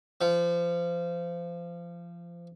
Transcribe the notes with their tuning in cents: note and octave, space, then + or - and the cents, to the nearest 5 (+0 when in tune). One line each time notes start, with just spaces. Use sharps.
F3 -25